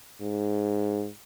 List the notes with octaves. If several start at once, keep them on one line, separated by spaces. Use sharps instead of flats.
G#2